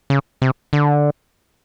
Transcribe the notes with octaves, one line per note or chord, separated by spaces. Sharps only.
C#3
C3
D3